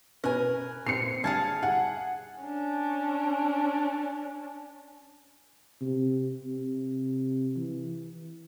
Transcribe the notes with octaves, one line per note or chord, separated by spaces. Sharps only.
B2 C#4 A#4 B4 G#5
A#2 C4 C7 C#7
D3 G3 G#4 F5 A5 G#6
G#4 F#5
C#4 D4
C3
C3
E3